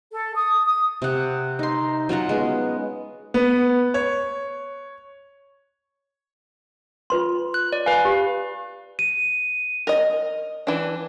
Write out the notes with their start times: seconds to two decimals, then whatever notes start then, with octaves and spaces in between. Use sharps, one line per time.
0.12 A4
0.35 D#6
0.67 D#6
1.02 C3 F#5
1.59 D#4 C6
2.09 F#3 C#4 F4 F#5
2.29 G#3 B3
3.34 B3
3.94 C#5
7.10 F4 B4 C6
7.54 F#6
7.73 D5
7.86 B4 F5 G#5
8.05 G4
8.99 D#7
9.87 A#4 D#5
10.67 E3 D4